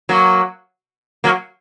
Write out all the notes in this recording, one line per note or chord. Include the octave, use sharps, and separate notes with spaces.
F#3 A#3
F#3 A#3